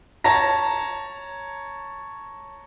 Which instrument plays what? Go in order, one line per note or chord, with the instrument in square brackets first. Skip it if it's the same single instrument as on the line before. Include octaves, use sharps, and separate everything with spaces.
[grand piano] C#5 A5 A#5 A#6